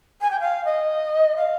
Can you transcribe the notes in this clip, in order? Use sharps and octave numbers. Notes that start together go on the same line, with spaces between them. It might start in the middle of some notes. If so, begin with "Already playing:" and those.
G#5
G5
F5
D#5
F5